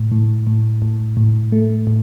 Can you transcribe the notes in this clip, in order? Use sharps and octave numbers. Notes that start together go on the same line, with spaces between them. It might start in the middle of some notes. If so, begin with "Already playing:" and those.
Already playing: A2
A2
A2
A2
A2
A3
A2